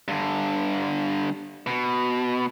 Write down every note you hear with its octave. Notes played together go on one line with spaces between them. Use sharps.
G2 D3
B2